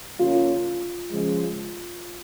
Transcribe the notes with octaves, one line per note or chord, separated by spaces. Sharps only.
C#3 A#3 C#4 F4
C#3 F3 G#3